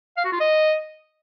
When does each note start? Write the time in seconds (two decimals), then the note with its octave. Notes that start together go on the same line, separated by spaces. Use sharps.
0.17 F5
0.25 F#4
0.32 F4
0.40 D#5